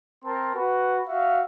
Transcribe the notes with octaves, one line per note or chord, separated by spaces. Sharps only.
C4 A#4 A5 C6
F#4 B4
F#4 E5 F5